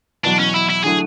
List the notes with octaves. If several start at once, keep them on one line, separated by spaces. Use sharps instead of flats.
E2 B2 F#3 D4
C#4
E4
E4
D3 F#3 A3 E4 G#4